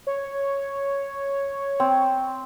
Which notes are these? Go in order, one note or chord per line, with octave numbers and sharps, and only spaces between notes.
C#5
C4